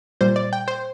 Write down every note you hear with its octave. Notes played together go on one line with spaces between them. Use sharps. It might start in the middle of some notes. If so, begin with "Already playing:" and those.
A#2 G3 C5
D5
G5
C5